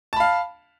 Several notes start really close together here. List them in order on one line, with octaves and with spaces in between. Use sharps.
A5 B5 F5